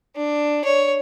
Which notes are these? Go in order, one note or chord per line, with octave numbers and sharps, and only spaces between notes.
D4
C#5